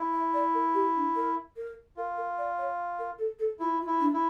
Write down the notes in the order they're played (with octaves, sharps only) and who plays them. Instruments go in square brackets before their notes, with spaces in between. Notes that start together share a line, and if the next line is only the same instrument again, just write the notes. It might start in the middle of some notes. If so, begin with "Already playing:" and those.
Already playing: [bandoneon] E4
[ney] E5
D5
A#4
G4
D4
A#4
A#4
[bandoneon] F4 [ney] A#4
[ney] A#4
D5
C#5
A#4
A4
A4
[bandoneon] E4 [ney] F4
[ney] F4
[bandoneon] E4
[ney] D4
[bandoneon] E4